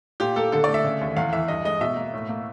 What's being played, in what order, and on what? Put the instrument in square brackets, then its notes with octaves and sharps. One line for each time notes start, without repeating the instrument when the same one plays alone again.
[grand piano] A#2 G4
A#3 A4
D3 A4
A3 D5
E5
C#3
D#2
E2 F5
E3 E5
G2 D#5
G#3 D#5
B2 E5
A#3
A2
A#3